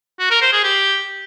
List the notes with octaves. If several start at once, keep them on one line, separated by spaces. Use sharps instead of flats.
F#4
A#4
C5
G#4
G4